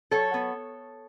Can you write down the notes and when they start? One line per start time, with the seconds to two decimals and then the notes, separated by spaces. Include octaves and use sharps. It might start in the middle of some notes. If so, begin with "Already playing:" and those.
0.11 F#3 A4 C#5
0.34 B3